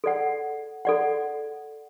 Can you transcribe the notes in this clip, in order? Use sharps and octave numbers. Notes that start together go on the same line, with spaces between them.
A4 D5 F#5
A4 D5 F#5